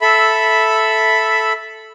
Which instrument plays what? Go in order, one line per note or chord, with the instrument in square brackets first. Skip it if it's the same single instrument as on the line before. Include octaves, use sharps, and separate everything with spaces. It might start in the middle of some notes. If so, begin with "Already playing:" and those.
[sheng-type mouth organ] A4 E5 B5